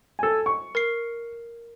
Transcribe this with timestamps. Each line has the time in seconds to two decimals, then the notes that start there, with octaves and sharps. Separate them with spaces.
0.19 A4 G#5
0.46 C#6
0.75 A#4 C7